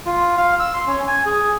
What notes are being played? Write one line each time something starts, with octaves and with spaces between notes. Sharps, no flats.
F4
F5
E6
C6
C#4
G#5
G#4